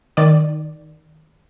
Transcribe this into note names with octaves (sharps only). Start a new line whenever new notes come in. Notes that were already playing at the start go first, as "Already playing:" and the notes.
D#3 D5